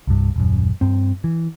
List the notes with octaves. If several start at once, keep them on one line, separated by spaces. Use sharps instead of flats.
C2 G2
D#1 F#2
G2 C4
E3